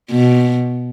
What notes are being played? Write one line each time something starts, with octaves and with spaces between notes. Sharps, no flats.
B2